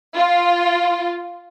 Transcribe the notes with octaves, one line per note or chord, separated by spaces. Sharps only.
F4